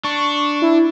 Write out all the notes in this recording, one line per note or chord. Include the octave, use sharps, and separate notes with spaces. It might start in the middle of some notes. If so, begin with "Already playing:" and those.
D4 C#6
E4